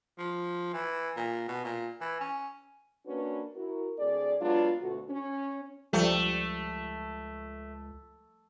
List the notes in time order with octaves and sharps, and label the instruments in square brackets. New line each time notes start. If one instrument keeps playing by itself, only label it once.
[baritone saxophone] F3
E3
A#2
B2
A#2
E3
C#4
[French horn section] A#3 C#4 D4 F#4 B4
E4 F#4 A#4
D2 C4 G#4 D5
F#3 G#3 B3 D4 F4
D2 B2 A3 F#4
C#4
[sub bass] C#2 [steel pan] F3 G3 [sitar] A3